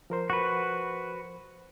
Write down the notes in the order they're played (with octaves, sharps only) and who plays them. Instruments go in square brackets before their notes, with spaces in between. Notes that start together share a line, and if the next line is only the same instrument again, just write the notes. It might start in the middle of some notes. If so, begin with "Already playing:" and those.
[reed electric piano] F3 A#4 C5
[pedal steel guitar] F#4 B4